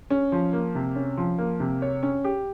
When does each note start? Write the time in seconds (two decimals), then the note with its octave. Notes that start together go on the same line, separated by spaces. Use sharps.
0.10 C#4
0.32 F3
0.53 A#3
0.75 C3
0.96 C#4
1.17 F3
1.38 A#3
1.60 C3
1.82 C#5
2.03 C#4
2.24 G4